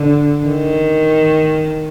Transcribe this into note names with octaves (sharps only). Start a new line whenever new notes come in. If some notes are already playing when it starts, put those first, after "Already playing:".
Already playing: D3
D#3